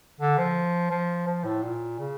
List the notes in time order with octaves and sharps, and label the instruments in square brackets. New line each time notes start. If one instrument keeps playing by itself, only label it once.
[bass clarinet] D3
F3
F3
F3
A2
A#2
C#3